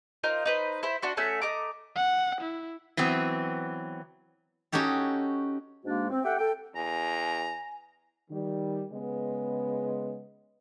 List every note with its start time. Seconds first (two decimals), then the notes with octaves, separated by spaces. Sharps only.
0.24 D#4 F4 A#4 C5
0.45 D#4 B4 C5
0.83 E4 C5 E5
1.02 D4 F#4 C6
1.17 A3 C#4 E5 F#5
1.42 A3 D#5 A#5 D6
1.96 F#5
2.41 E4
2.97 E3 F#3 B3 C4
4.72 C#4 D#4 F#4 G4 A4
5.84 G#2 G#3 A#3 D4 F#4
6.10 C4
6.24 G4 A4 E5 F#5 G5
6.39 A4 G5
6.75 E2 G#5 A#5
8.31 D#3 G3
8.90 C#3 G#3 B3